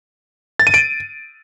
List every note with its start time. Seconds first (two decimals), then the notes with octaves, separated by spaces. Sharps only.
0.59 A6
0.67 D#7
0.74 D7